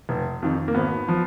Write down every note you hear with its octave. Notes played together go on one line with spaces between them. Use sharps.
F1
F2 D#3
A#3
G#1 B3
F3